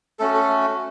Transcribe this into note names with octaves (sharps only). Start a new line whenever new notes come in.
A3 C#4 F#4 A4
A4